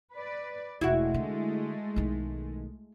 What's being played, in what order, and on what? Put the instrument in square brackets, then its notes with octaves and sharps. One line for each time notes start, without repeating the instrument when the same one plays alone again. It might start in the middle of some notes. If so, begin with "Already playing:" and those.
[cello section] B4 D5
[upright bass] E1 [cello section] G#3 A3 [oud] E4 F#4
[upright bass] D3
B1 D#3